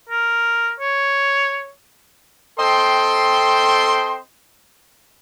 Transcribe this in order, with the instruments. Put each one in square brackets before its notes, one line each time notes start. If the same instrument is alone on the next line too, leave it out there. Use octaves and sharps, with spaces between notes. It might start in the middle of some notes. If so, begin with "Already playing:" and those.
[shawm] A#4
C#5
[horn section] C4 A4 C5 D#5 G5 C6